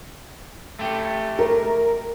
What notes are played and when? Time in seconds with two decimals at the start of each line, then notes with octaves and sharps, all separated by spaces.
0.79 A3 G4
1.39 A#4